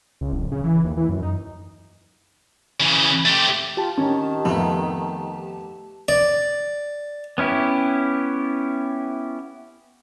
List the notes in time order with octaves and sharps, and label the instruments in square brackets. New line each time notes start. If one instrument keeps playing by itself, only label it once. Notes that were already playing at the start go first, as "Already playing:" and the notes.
[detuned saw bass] C#2
D1
C#3
E3
D#2
E3
F#2
D#4
[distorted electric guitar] C#3 E3
A3 G4
[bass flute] F4 [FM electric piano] G4 A5
[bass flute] D#3 [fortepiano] C#4
[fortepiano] F2 [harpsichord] A3 B3
[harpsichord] D5
[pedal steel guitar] B3 C#4 E4 G4